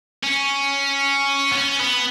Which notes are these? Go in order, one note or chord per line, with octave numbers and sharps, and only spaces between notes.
C#4
B3
C#4
B3